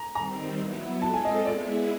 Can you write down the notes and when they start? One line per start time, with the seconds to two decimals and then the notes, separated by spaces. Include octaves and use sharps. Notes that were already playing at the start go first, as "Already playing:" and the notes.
Already playing: A#5
0.15 D#3 G3 C4 A#5
0.59 F#3 B3 E4
1.02 G#3 C4 F4 A4 A5
1.14 G#5
1.25 D#5
1.45 G#3 B3 E4 G#4 D5